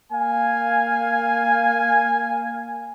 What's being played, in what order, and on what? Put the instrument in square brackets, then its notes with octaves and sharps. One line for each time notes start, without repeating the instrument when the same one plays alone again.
[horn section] A#3 F5 G#5